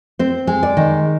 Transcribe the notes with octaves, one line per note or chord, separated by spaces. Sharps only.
C4 C5
G#3
D5
D#3